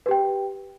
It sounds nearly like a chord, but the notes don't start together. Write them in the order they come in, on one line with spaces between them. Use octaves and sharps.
B4 G4 G5